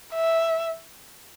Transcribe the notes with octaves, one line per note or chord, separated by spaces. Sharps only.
E5